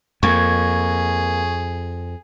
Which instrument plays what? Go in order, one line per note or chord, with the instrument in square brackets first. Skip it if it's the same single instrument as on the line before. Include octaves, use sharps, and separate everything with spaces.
[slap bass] F2 [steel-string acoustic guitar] A#3 [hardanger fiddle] G#4 [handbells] C#6 G#6